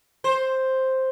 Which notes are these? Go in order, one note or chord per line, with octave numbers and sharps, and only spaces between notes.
C5